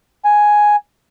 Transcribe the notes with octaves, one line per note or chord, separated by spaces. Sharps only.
G#5